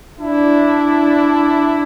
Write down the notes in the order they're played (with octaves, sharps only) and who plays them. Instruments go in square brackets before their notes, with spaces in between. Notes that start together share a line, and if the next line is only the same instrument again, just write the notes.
[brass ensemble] D4 E4